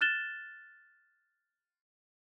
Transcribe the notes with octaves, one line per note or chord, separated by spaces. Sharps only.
F6 F#6 A6 E7 G7